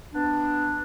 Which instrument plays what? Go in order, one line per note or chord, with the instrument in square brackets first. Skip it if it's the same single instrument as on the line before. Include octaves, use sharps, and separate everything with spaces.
[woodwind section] B3 D4